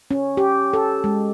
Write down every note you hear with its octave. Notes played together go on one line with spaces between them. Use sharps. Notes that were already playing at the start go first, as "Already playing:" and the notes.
C#4
G4
A4
G#3